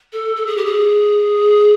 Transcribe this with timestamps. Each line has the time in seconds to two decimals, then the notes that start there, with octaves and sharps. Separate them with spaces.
0.13 A4
0.36 A4
0.46 G#4
0.56 G4
0.65 G#4